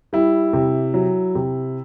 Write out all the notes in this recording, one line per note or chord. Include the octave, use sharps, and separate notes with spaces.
G3 E4
C3
F#3
C3